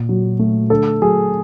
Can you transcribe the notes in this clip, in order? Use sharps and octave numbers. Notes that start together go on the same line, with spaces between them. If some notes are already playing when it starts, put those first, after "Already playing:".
Already playing: A#2
F#3
A3
D3 A4
F#3 G#4